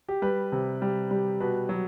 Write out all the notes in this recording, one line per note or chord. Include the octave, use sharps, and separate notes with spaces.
G4
G3 B4
C3
G3
G3
B2 B4
F#3